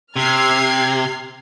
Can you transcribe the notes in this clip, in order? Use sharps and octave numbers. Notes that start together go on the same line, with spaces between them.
C3 F6 G#6 C7